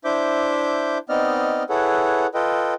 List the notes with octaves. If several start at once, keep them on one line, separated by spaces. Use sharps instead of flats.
D4 E4 C5 E5 D6 G6
B3 C4 D#4 D5 D#5 F6
E4 G#4 A4 B4 C#5 F#5
F4 A4 B4 D#5 G5